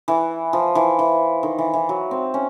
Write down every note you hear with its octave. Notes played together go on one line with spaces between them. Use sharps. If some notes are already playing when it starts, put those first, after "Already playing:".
E3
F3
E3
E3
D#3
E3
E3
F#3
C4
C#4